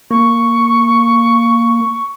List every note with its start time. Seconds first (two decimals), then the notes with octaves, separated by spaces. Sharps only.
0.11 A#3 C#6